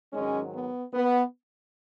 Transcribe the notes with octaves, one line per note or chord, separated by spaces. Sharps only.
G#2 D#3 F#3 G#3 C#4
B3
B3